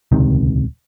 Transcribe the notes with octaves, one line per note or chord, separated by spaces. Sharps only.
D#1 C#2 C3 D#3